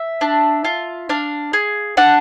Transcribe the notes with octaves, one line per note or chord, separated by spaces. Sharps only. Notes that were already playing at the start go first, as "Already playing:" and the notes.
Already playing: E5
D4
F4
D4 F5
G#4
D4 F#5